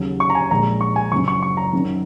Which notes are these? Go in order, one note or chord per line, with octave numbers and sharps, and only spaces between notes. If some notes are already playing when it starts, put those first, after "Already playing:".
Already playing: D#2 C#3 F#3
C#6
A#5
G#5
A#1 A#2 G#3 A#5
C#6
G#5
F#1 F#2 F#3 C#6
C#6
C#6
A#5
F#2 D#3 F#3